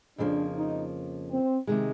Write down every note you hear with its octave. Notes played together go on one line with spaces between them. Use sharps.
F2 C#3 F3 A#3 D4
D#4
C4
C3 D#3 G#3